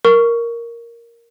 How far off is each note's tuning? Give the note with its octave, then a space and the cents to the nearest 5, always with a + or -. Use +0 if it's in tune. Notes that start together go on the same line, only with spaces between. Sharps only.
A#4 +0 C#6 +15